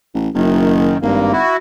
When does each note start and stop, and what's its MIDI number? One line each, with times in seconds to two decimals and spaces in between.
0.14 0.29 33
0.34 0.96 30
0.34 0.97 42
0.34 0.97 51
1.02 1.39 32
1.02 1.32 43
1.02 1.32 58
1.33 1.57 64
1.33 1.57 66